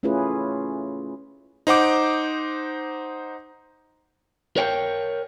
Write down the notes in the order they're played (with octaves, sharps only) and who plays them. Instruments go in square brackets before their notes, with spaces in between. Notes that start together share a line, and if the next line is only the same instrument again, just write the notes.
[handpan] A3 C#4 E4 F4 G#4 B4
[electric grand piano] D#4 C5 F#5 D6
[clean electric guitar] A#4 C#5 G5